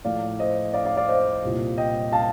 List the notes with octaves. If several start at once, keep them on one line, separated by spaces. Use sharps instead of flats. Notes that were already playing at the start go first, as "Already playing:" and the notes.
A2 F3 A3 D5 F5
C5 D#5
D5 F5
D5 F5
D5 F5
C5 D#5
C2 A#2 G3
D#5 G5
F5 A5